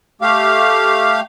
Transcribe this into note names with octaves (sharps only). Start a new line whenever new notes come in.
A3 G4 F5